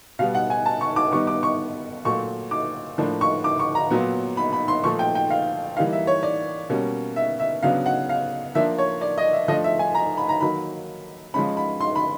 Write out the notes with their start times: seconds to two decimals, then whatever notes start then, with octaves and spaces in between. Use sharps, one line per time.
0.19 B2 G3 B3 F5
0.35 F#5
0.50 G#5
0.66 A5
0.81 C#6
0.96 D6
1.12 D#3 G3 B3 D#4 C#6
1.27 D6
1.43 C#6
2.05 A#2 F#3 A3 C#6
2.51 D6
2.98 A2 F3 A#3 D4
3.21 C#6
3.44 D6
3.59 C#6
3.75 A#5
3.90 A#2 F#3 B3
4.37 B5
4.53 B5
4.68 C6
4.84 A#2 F3 A3 C#6
4.99 G5
5.15 G5
5.30 F5
5.76 E3 G3 A#3 D#4 F5
5.93 E5
6.07 C#5
6.23 D5
6.69 B2 G3 A#3 C#4
7.16 E5
7.39 E5
7.63 C#3 F#3 B3 D4 F5
7.86 F#5
8.09 F5
8.55 F3 A#3 D4 E5
8.78 C#5
9.01 D5
9.18 D#5
9.33 E5
9.48 F3 A3 D4 D#5
9.64 E5
9.79 G#5
9.95 A#5
10.17 B5
10.29 A#5
10.40 D#3 F#3 A#3 B5
11.34 F3 G#3 C#4 B5
11.57 B5
11.80 C6
11.96 B5